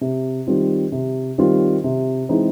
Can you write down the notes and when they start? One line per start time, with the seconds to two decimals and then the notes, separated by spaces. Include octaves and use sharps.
0.01 C3
0.47 D#3 G3 C4 F4
0.92 C3
1.38 D#3 G3 C4 F4
1.84 C3
2.29 E3 G#3 C4 D#4